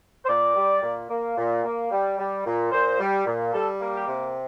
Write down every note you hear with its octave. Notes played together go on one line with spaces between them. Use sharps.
C5
A#2 D5
G3
A#2
A#3
A#2
A#3
G3
G3
A#2
A#2 C5
G3
A#2
G3 A4
A#3
G4
C3